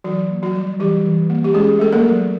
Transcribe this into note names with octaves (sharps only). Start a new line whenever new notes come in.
E3 F#3 F#4
A#3
F#3 F#4
G3
E3 G3 G4
E3
A#3
G4
G#3 C#4 G#4
A3 A4
A#3 A#4
F#3